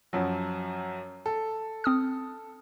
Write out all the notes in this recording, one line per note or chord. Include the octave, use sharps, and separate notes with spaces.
F#2 F3 F#3
A4
C4 D#6 F6